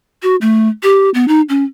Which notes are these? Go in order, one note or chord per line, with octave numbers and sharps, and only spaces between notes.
F#4
A3
G4
B3
D#4
C#4